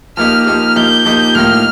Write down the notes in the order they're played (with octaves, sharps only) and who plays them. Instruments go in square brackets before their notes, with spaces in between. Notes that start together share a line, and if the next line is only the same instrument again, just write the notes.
[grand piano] F3 A#3 D#4 G4 [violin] F6
[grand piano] F3 A#3 D#4 G4 [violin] F6
[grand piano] F3 A#3 D#4 G4 [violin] G6
[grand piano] F3 A#3 D#4 G4
[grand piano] A2 F3 A#3 D#4 [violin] F6